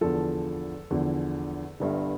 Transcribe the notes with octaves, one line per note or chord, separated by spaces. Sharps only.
E2 D3 F3 A4
E2 D3 F3
G1 G2 D3